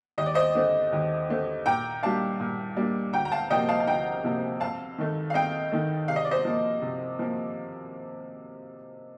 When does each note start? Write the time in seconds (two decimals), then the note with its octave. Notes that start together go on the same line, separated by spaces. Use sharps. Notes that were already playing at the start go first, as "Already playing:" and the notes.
0.18 D#2 D#5
0.26 D5
0.34 C5 D#5
0.55 D3 A3 C4
0.92 D#2
1.29 D3 A3 C4
1.66 A#2 G5 A#5
2.03 G3 A#3 D4 F5 A5
2.40 A#2
2.76 G3 A#3 D4
3.13 D2 G5 A#5
3.25 A#5
3.32 F5 A5
3.50 C3 F3 A#3 D#5 G5
3.69 F5 A5
3.80 A5
3.87 D2 G5 A#5
4.24 C3 F3 A#3
4.60 F2 F5 A5
4.98 D#3 A3
5.30 F5
5.34 F2 D#5 G5
5.72 D#3 A3
6.08 C3 F5
6.16 D#5
6.25 D5
6.31 C5 D#5
6.45 F3 A#3
6.82 C3
7.19 F3 A#3